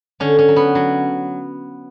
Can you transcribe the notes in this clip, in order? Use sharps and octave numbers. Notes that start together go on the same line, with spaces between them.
D3 C#4
C#4
F#3
B3
F#3